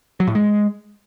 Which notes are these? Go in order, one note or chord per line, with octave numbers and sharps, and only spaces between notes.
F#3
A2
G#3